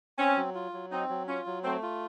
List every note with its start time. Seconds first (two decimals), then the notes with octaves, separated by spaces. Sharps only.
0.18 C4 C#4
0.37 F#3
0.55 F4
0.73 F#3
0.92 C4 D#4
1.09 F#3
1.28 C#4 F4
1.46 F#3
1.64 A3 C4
1.83 F4